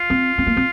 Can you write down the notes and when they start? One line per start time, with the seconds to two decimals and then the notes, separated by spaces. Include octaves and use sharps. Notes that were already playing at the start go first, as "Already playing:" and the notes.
Already playing: F4
0.10 C4
0.38 C4
0.47 A#3
0.57 C4